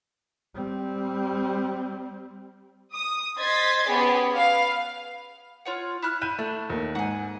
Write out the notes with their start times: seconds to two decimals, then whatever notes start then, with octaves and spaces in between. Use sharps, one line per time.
0.55 G3 C4
2.95 D#6
3.39 C5 D#5 C6 G#6 A6 B6
3.88 B3 C#4 G4 G#4
4.35 B4 F5
5.65 F4 C#5 F#5
6.03 E4 F6 F#6
6.22 E4 F#6 G6 D#7
6.39 A3 D4
6.70 D#2
6.95 G#2 F#5 G#5